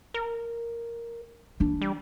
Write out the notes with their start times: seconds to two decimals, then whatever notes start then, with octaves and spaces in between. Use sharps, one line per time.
0.14 A#4
1.60 E3 D4
1.82 G3